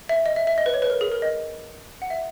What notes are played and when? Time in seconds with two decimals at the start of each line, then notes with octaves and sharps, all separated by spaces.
0.09 E5
0.26 D#5
0.36 E5
0.47 E5
0.58 D#5
0.66 B4
0.74 C#5
0.82 B4
0.90 A#4
1.01 G#4
1.12 A#4
1.22 D#5
2.02 F#5
2.10 E5